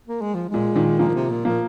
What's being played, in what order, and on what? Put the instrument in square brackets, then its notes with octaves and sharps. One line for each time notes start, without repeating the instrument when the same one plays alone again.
[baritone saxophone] A#3
G#3
F3
[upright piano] A#2 [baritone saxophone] G#3
[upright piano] A#2 D#3
[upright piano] F3 A#3 [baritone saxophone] G#3
[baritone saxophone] A#2
C3
A#2
[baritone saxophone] A#2 [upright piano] F3 A#3